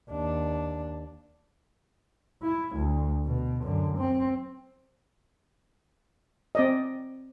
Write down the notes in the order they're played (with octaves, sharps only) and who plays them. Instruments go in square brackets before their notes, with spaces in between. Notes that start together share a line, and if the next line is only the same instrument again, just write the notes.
[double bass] D#2 D4
E4
D2
B2
F#2 D3
C4
[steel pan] C4 D5 D#5